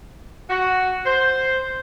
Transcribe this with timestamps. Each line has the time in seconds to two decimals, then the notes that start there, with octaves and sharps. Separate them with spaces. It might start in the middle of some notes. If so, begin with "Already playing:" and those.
0.50 F#4
1.06 C5